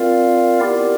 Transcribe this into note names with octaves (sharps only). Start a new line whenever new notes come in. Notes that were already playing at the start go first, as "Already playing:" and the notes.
Already playing: C4 F4 A#4 D5 F5
B3 E4 G4 A#4 D5